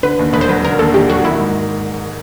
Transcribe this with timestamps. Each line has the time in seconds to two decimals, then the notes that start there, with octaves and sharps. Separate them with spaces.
0.03 D3 B4
0.19 D#2
0.33 E1 B4
0.41 C5
0.49 F#3 B4
0.64 D3 A#4
0.79 D#2 A4
0.94 E1 G4
1.10 F#3 F#4
1.24 D#3 E4
1.39 G#2